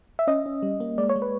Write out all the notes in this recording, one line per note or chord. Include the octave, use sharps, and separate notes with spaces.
E5
C#4 D#5
C#4
G3
A#3
G#3 D5
C#5
G#3
B4